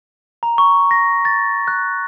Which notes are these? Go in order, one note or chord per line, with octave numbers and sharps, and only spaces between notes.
A#5
C#6
A#6
A6
F#6